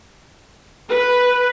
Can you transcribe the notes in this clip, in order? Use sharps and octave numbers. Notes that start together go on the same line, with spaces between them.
B4